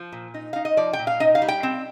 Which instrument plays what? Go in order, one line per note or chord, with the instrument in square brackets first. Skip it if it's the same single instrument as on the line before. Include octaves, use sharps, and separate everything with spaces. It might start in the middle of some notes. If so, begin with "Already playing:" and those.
Already playing: [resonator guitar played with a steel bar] F3
A#2
D#4
D#4 F5
D#5
F3 D5
G5
A#2
F5
D#4 D#5
F5
G3
G5
C4